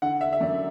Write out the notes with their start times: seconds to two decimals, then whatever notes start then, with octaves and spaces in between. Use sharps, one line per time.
0.02 D3 F#5
0.21 E5
0.33 E5
0.41 F#2 D5